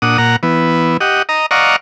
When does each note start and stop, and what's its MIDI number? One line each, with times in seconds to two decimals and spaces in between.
0.02 0.18 46
0.02 0.18 62
0.02 0.18 78
0.02 0.18 87
0.18 0.36 46
0.18 0.36 78
0.18 0.36 82
0.43 0.97 52
0.43 0.97 59
1.01 1.22 67
1.01 1.22 75
1.01 1.22 78
1.29 1.46 75
1.29 1.46 82
1.51 1.76 74
1.51 1.76 75
1.51 1.76 77
1.51 1.76 78
1.51 1.76 82
1.51 1.76 85